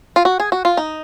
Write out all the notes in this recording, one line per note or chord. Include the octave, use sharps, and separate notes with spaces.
F4
F#4
G#4
F#4
F4
D#4